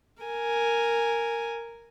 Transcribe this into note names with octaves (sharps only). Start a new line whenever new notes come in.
A#4 G#5